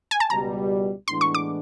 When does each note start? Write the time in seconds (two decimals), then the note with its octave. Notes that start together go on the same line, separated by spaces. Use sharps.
0.11 G#5
0.20 A5
0.30 C#2 B2 G3 A#5
1.08 A2 E3 G#3 B3 D4 C6
1.21 C#6
1.35 D6